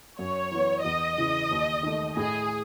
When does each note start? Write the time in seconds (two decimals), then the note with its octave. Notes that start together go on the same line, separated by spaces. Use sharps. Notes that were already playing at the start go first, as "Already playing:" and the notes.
0.19 F#2 C#5
0.52 E3 B3
0.84 E2 D#5
1.17 C#3 E3
1.51 D#2
1.83 D#3 A3
2.17 A2 G#4